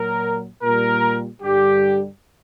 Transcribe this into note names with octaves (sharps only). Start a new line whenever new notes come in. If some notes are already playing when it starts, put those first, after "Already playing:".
Already playing: A#2 F#3 A#4
A#2 G3 A#4
G2 D3 G3 G4